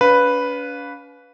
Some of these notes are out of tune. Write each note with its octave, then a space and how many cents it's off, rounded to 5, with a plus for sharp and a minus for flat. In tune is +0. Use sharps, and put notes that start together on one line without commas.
C#4 +45 B4 +0 F5 +20